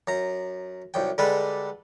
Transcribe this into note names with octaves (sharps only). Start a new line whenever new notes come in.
F#2 A#5
C2 F#2 G5
D3 G3 G#3 A4 B4